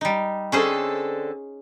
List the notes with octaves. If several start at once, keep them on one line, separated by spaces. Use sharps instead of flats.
G3 D#4
D3 C4 C#4 G#4 A4 C5